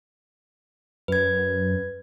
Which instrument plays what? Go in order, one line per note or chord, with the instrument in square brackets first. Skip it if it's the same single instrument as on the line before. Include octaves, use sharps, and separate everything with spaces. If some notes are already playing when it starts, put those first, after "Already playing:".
[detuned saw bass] F#2 [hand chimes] B4 G#6